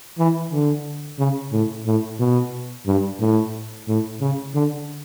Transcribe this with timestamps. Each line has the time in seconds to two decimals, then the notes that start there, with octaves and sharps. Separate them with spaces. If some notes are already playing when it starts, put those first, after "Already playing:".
0.18 E3
0.52 D3
1.19 C#3
1.52 A2
1.86 A2
2.19 B2
2.87 G2
3.20 A2
3.88 A2
4.21 C#3
4.54 D3